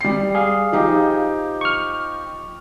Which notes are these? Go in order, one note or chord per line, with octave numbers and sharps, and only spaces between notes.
G3 C7
G#4 F5
F3 D#4 G4
C#6 F6